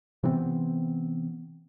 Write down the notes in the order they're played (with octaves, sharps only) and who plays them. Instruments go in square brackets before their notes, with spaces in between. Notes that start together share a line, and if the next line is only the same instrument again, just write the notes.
[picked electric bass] C3 E3 B3 C4